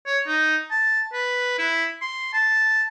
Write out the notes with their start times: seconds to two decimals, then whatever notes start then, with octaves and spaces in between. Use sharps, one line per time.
0.06 C#5
0.27 D#4
0.71 A5
1.13 B4
1.58 E4
2.02 C6
2.33 A5